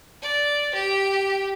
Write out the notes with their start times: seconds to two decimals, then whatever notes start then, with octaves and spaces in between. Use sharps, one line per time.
0.22 D5
0.75 G4